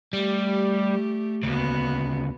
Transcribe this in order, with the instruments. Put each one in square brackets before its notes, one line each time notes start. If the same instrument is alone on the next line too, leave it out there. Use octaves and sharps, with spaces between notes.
[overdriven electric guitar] G3 [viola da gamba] A3 G4
[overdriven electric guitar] D2 C#3 [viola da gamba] A#3 B3 F#4